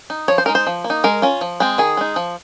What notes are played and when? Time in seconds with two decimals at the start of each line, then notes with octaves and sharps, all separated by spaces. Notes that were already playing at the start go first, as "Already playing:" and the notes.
0.10 D#4
0.28 F3 C#5
0.38 C5
0.46 G#3 D#4 A#4
0.55 C5
0.67 F3
0.84 A#3
0.90 D#4
1.04 G#3 A#4
1.22 C#4 F4
1.41 F3
1.60 G#3 C4
1.78 D#3 G#4
1.97 G#3 D#4
2.16 F3